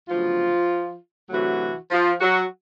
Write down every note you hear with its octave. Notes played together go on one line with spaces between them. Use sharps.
D2 C#3 F3 F#3 B3 F4
D2 C3 E3 F#3 A3 F#4
F3 F4
F#3 F#4